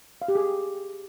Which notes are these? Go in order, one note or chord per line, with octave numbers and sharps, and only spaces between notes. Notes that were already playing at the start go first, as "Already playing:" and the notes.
F5
G4
G#4